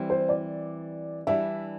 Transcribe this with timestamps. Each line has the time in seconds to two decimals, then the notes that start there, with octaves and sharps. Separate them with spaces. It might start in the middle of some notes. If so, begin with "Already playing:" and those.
Already playing: E3 G3 C4
0.10 C5
0.29 D5
1.27 E3 G3 D4 E5